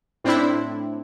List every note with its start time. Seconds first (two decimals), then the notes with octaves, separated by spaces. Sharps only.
0.24 A2 C4 D4 E4